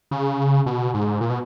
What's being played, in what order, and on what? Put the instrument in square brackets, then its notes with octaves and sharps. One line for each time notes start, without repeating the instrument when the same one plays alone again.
[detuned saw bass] C#3
B2
G#2
A#2
B2